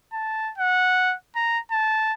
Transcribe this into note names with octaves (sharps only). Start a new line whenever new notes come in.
A5
F#5
A#5
A5